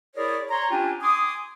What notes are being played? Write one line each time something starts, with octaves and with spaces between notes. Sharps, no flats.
E4 G#4 A#4 C#5 D5
C#5 A#5 C6
C#4 D4 F4 G4 G5 G#5
G#5 C6 D6 D#6